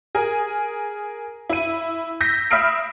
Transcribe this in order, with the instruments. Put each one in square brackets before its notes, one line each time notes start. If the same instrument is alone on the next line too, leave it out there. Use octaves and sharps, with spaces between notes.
[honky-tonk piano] G#4 A#4 G#5
E4 D#7
E6 G6 A#6 B6
E5 B5 D#6 F6 C7 D7